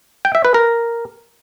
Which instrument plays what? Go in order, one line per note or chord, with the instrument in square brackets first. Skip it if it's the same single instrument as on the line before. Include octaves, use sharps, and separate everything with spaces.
[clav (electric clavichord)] G5
E5
B4
A#4